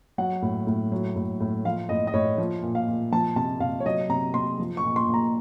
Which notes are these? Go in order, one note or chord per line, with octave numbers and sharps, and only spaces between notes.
F#3 F#5
A2
A2
F#3
A2
A2
F3 F5
A2 D#5
D#5
A2 C#5
F3
A#2
F5
A#2
F3 A5
C3 A5
C3 F5
C#5
F#3 D#5
C3 A#5
C3 C6
F3
C#6
A#2
C6
A#2
A#5